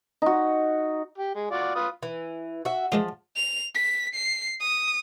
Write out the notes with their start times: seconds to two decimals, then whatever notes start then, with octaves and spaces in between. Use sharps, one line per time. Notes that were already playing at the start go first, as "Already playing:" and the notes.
0.22 D#4 F#4
1.18 G4
1.35 G#3
1.51 F4 F#4 D5
1.75 F4 B4 D#6
2.03 E3
2.65 F#4 E5
2.92 E3 F3 G#3 F4
3.36 F7
3.75 B6
4.15 C7
4.61 D#6